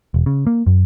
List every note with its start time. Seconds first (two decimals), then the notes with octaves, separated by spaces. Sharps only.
0.14 E1
0.26 C#3
0.47 A#3
0.66 F#2